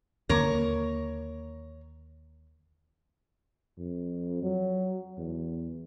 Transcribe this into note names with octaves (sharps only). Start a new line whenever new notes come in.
D#2 D3 A#3 A#4 C#5
F2
F#3
E2